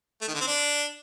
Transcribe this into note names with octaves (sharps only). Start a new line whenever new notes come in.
A3
D#3
D3
C4
D4